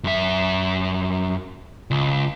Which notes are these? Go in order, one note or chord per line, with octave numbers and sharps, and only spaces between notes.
F#2 E5
C#2